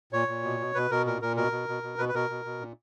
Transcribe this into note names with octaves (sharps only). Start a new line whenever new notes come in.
A#2 C#5
A#2
B2
B2
B2 B4
B2 A#4
A#2 A#4
A#2 A#4
B2 A#4
B2
B2
B2
B2 B4
B4
B2 A#4
B2
B2
A#2